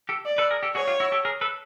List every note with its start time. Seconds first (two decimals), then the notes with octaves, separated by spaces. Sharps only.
0.09 G4 A4
0.25 D5
0.38 A4 B4
0.51 G#4 A#4
0.63 G4 A4
0.75 F#4 G#4 C#5
0.87 F4 G4
1.00 E4 F#4
1.12 G4 A4
1.25 G#4 A#4
1.41 A4 B4